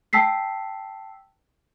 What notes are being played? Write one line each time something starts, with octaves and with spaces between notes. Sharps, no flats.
G5 A5 E6 B6 C7